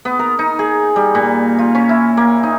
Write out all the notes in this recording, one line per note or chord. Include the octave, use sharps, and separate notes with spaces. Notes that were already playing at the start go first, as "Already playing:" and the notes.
B3
A#4
D#4
G#4
G3
A#2
F4
C#4
E4
A#3
D#4